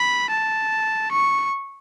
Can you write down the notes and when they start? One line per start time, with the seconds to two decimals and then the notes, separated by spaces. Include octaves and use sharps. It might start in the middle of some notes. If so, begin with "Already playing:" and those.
Already playing: B5
0.30 A5
1.11 C#6